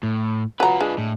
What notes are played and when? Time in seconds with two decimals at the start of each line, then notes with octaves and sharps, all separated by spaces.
0.03 A2
0.60 F#3 F4 B4 A#5
0.80 G#3 D4
0.98 A2